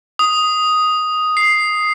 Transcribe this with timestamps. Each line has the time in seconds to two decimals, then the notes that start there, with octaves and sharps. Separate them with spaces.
0.19 D#6
1.37 C7